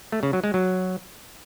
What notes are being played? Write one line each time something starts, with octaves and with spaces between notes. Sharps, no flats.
A3
C#3
F#3
G#3
F#3